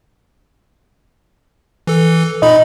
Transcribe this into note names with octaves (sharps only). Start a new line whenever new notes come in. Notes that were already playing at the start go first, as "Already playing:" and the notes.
E3 A4
A#2 D#4 D#5 B5